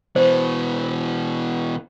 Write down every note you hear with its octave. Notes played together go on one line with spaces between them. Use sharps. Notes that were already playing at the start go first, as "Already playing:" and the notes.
B2 E3 C5